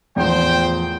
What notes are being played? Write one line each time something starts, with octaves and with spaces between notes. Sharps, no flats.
E2 A2 F3 C5 G5